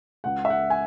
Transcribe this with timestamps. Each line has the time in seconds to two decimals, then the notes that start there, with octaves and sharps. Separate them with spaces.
0.24 C#2 F#5
0.45 E5
0.50 F#5
0.70 G#5